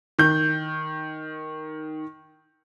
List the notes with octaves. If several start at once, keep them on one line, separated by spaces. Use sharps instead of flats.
D#3 G6